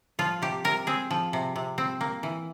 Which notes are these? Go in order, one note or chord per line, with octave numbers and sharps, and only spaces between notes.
F3 F4
C3 G4
C3 A#4
C4 G#4
F3
C3
C3
C4
A#3
E3